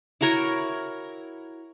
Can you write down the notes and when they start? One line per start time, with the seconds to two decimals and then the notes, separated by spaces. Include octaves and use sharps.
0.21 E4 F#4 A#4 C#5